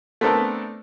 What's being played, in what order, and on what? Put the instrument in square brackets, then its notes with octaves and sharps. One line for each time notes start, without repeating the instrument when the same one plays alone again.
[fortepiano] A3 B3 C4 D4 A4 A#4